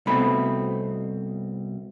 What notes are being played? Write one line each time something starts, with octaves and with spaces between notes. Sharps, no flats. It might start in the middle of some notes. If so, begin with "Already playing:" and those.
C2 B2 A3 C4 B5